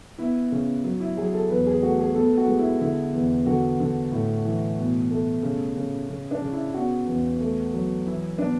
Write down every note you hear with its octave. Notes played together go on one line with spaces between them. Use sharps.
B3 E4
C#3
F#3
E4
F#3 G#4
A4
E2 B4
G#4
A3 F#4
G#4
B3 A4
F#4
G#3
E4
D3 E4
E2
D3 F#4
D3
A2
E3
B2
A3
C#3
C#3
C#3
D4
C#3
E4
B3 F#4
E2
A3
F#3
E3 E4
B3 D4